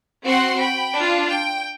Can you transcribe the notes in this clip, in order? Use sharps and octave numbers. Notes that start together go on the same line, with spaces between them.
C4 F#4 F#5 C6
G5 B5
D4 F4
G5